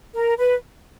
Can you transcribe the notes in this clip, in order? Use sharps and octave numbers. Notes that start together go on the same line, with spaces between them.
A#4
B4